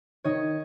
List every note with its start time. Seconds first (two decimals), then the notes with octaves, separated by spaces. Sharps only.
0.24 D#3 C#5 D#5